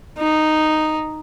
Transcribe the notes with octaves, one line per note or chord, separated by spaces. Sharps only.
D#4